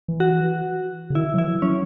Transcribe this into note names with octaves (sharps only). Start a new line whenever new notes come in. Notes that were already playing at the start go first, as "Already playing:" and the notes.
E3
F#4
C#3
D#3 E4
F#3
E3 E4
F#3 C#4